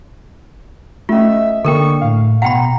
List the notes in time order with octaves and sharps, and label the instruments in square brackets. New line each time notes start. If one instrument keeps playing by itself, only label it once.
[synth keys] A3 D#5 [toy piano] C#4 F4 [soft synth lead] E5
[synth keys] D3 A#3 [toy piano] A4 A#4 G5 [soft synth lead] C#6
[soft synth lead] A2 [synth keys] F5
[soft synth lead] B2 [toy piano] F#5 G5 B5 [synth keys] A#5